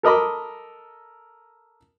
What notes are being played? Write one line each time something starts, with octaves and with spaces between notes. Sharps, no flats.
A4 A#4 D#5 B5 D6